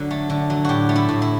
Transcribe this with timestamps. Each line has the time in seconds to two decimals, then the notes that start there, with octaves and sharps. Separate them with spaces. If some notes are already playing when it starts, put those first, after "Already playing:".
Already playing: D3 F#3
0.11 A3
0.30 D3
0.50 F#3
0.64 A2 F#4 G4
0.89 A3
0.96 E4
1.08 A2
1.22 E4